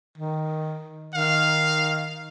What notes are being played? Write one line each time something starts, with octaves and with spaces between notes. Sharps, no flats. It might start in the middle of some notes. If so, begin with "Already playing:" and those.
D#3
D#3 F5